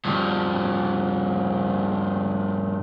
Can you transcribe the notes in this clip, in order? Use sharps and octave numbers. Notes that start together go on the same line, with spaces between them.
G2 F3